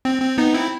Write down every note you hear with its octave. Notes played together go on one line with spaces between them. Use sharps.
C4
C4
B3 D#4
C4 E4